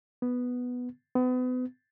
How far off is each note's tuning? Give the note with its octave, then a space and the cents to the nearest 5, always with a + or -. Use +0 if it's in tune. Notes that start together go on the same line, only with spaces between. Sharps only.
B3 +0
B3 +35